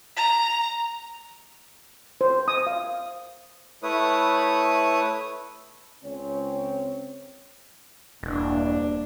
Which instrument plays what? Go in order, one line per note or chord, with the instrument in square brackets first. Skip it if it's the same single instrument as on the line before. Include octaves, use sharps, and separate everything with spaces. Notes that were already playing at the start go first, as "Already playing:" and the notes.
[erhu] A#5
[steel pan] C5
D#6
F5
[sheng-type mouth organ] A3 E4 B4 C#5 D#6
[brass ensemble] C#2 C4 C#4 C#5
[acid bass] E1 [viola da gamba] G2 A#3 D4